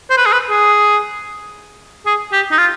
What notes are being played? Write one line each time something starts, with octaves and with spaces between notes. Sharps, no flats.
C5
B4
G#4
B4
G#4
G#4
G4
D#4
F4